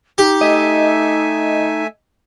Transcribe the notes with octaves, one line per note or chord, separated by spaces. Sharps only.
D#4 G4
A3 D#5 E5 G#5